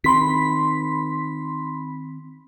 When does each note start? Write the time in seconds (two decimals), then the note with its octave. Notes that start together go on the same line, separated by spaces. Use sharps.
0.04 D#3 C4 B5 C6 B6